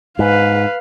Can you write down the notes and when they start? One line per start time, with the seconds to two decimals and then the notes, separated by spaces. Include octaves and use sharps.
0.19 G#2 B4 F5